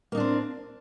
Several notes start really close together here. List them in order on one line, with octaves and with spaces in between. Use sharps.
A#3 D#4 D4 C4